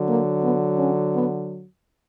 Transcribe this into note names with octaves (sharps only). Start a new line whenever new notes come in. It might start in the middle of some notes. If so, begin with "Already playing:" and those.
Already playing: D3 F#3
A#3
B3
C#4
B3